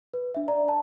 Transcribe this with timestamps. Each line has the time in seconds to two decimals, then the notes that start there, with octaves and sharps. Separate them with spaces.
0.14 B4
0.34 D4 E5
0.48 D5 A#5
0.68 A5